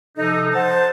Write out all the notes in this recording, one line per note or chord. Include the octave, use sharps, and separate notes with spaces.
C3 F3 D#4 A4
C5 F#5 A5